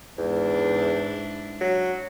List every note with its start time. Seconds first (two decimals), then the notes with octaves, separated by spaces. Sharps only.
0.18 E2 G#2 D4 E4
1.61 F#3